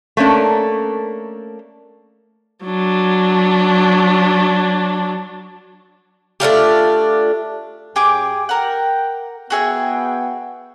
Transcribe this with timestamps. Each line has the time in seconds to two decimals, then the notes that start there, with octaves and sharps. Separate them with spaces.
0.17 A3 A#3 C#4 D4 A#4
2.65 F#3 D4
6.40 A3 D4 F4 G4
7.96 F#2 G4 G#4 G#5 D6
8.49 A#4 F#5 G5
9.50 B3 F#4 G#4 E5 G5